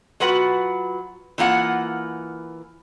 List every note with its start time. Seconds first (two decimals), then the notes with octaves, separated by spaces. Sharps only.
0.20 F#3 F4 F#4 B4 F#5
1.38 E3 A#3 F4 F#5